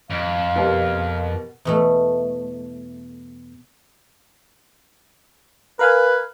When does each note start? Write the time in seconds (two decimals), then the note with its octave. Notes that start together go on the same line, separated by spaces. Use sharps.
0.10 F2 F5
0.56 B2 G4 A#4
1.65 E2 B2 A3
5.79 A#4 B4 F5 G#5